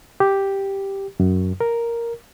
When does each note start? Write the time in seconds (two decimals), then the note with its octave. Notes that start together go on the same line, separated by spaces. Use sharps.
0.20 G4
1.20 F#2
1.61 A#4